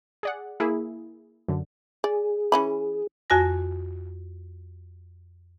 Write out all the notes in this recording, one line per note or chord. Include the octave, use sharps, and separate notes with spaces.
G#4 D5 F#5
A#3 E4 G#4
F#2 D3
G#4 D5
E3 C#4 B5
F2 F#4 G#5 A#6